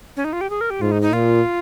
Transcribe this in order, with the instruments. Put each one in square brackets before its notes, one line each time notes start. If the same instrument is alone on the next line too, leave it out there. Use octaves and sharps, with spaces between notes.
[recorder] C#4
D#4
F4
G4
G#4
A#4
G4
[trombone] G#2 [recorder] F4
[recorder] D#4
D#4
[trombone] A#2 [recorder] F4